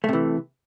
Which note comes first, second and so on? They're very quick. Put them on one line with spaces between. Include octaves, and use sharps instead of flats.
A3 C3 E3